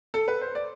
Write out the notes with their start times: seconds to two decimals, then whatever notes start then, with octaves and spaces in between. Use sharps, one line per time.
0.14 A4
0.28 B4
0.41 C5
0.55 D5